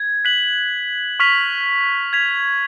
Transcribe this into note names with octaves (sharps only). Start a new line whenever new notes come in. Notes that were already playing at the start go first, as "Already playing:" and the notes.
Already playing: G#6
F#6 B6 F#7
C#6 F6 B6 F7
G#6 B6 F7